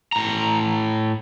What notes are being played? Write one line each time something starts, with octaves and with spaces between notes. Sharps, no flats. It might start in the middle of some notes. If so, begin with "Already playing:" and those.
A2 A#5